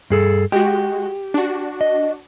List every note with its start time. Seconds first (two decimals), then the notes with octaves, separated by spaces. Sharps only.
0.10 G2 G#4 A4
0.52 G#3 F#4 G4
1.34 D4 F#4
1.81 D#5